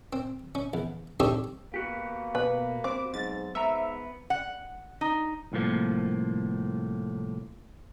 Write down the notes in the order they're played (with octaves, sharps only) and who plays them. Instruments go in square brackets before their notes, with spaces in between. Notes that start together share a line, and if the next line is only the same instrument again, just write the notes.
[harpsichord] C4
C#4
E2
C4 D4 D#4 G4 A4 C#5
[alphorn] A#3 [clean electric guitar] B3 F#4 G4
[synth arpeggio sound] B2 [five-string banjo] B4
[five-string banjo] C4 [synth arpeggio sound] D6
[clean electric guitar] B1 [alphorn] G#2 [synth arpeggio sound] A6
[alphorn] G#2 [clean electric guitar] B3 A#5 [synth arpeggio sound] E5
[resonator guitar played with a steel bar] F#5
D#4
[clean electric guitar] C2 A2 F3 A#3